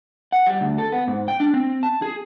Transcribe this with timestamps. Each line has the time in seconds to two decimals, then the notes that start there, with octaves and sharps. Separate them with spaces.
0.32 F#5
0.46 G3
0.61 D2
0.78 A4
0.92 B3
1.08 G#2
1.28 G5
1.40 D4
1.54 C4
1.83 A5
2.02 G#4